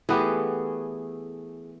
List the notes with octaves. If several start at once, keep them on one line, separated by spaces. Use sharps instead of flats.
E3 A3 B3 G4 G#4